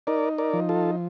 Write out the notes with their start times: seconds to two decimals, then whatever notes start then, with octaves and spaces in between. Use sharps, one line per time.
0.07 D#4 A#4 D5
0.38 A#4 D5
0.54 F3
0.69 F4 A4